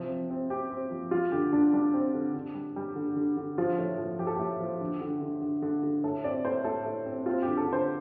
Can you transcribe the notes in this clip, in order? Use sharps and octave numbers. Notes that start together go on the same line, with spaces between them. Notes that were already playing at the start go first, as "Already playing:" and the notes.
Already playing: C3 F3
C4
C4
C4 G4
C4
F3
G3 F4
D3 G4
D3 D4
G3 D4
C4
D3
D3
G3
G3
D3
D3
D3
F3 F4
A2
F3
F3 G4
A4
A2 G4
F3
D3
D3
D3
D3
D3
D3
A2 A4
C4 D5
A2 C5
A2 A4
A2
C4
C4 F4
D3 G4
A4
D3
C5